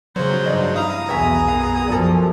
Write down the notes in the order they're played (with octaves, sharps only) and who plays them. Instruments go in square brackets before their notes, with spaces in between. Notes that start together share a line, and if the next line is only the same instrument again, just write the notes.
[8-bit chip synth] C#3 F#3 [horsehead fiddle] C5 [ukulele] C#5
[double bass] G2 [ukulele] D#4 D5 D#5
[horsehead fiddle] E4 F5 [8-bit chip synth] A#5 D#6
[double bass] B1 E2 [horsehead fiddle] B3 G#4 [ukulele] C#5 E5 G#5
[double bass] F#2 [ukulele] F5
[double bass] F#2 F3 [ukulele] A4 D5